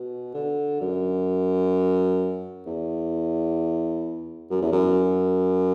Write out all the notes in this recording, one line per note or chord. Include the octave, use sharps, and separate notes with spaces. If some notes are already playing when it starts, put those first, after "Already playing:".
Already playing: B2
D3
F#2
E2
F#2
E2
F#2